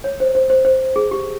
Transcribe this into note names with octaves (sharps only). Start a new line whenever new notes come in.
C#5
C5
C5
C5
C5
G#4
G4